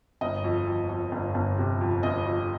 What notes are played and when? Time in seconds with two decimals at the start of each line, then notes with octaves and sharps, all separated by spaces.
0.21 G1 D#5
0.44 F2
0.67 F2
0.89 F2
1.12 G1
1.35 G1
1.58 C3
1.81 F2
2.03 G1 D#5
2.26 F2